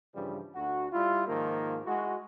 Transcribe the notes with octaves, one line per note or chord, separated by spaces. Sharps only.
G2 C#3 E3 F3 G3
D2 F#4
G3 E4 F4
G#2 D#3 F3 A#3
G#3 E4 F#4